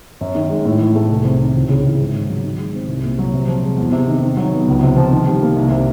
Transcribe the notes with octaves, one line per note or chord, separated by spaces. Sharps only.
F#2
D#3
G#3
A2
E3
A3
C2
C3
D#3
C#2
C#3
E3
G#2
D#3
F#3
D#3
G#3
C4
C2
A#2
F#3
C3
F3
G#3
E2
C3
D#3
D#3
F#3
B3
C#2
C3
F3
D#3
G3
A#3
C2
C3